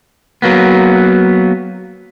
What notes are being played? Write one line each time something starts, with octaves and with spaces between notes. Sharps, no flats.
F#3 A#3 B3